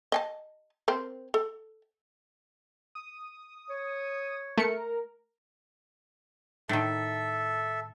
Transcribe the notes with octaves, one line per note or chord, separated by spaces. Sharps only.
D#5 G#5 A5
C4 A#4 C5
A4
D#6
C#5
A3 A#4 C#7
A2 D#3 A4 E5